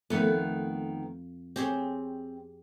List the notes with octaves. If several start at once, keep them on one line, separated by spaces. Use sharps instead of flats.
F2 D#3 F3 A3 B3
C4 G4 G#4 C#5